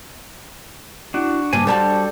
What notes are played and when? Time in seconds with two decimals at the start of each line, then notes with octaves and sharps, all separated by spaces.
1.14 D4 E4 F#4
1.53 G2 C#3 A#3 D4 G#5
1.67 G3 D4 F#4 G4 A4 C5 D5 A5